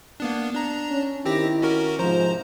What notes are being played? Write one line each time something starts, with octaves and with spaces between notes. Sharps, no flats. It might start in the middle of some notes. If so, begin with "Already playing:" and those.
A#3 B3 D4
D4 A#5
C#4
D#3 C4 E4 G4 A#6
C#4 F#4 A#4
G#2 C3 F3 C5 A#5